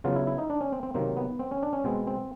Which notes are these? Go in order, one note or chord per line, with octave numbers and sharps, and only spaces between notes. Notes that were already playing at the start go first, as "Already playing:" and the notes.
C#3 F#3 B3 F4
E4
E4
D#4
D4
C#4
C4
C4
C3 D#3 F#3 A#3 C4
B3
C4
C#4
D4
C#4
B2 G#3 B3 C4
C4